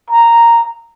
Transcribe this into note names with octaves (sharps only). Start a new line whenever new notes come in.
A#5